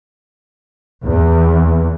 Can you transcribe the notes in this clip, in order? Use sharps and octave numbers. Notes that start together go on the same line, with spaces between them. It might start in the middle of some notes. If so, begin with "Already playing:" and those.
E2